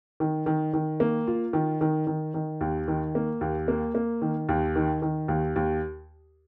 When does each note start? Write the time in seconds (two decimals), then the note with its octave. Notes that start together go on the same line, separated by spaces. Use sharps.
0.20 D#3
0.46 D#3
0.74 D#3
1.00 A#3
1.27 F4
1.53 D#3
1.81 D#3
2.07 D#3
2.34 D#3
2.61 D#2
2.88 D#3
3.15 A#3
3.41 D#2
3.68 A#3
3.95 A#3
4.22 D#3
4.49 D#2
4.76 D#3
5.02 D#3
5.28 D#2
5.56 D#2